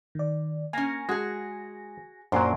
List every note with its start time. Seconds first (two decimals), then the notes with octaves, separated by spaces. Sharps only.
0.15 D#3 D5
0.73 A#3 C#4 G#5 A#6
1.09 G#3 F#4 G#4
2.32 F#2 A#2 F#3 D4 C5 D5 C6